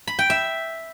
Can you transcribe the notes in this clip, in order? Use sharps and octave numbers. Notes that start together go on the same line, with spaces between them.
B5
G5
E5